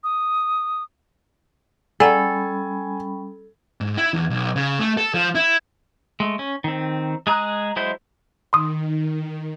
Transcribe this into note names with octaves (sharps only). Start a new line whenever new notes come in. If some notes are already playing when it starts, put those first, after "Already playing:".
D#6
G3 C#4 A4 D5 F#5 G#5 A#5 B5
G#2
E4
E2
B1
C#3
A3
A4
F3
E4
G#3 A3
C#4
D#3 C4
G#3 G#4 A#5 D#6 F#6
F#3 G#3 E4 C5 G6
D#3 C6 D#6